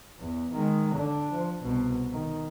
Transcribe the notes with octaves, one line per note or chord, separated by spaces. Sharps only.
E2
D#3 G#3
D3 D4
F3
C2 B2
D#3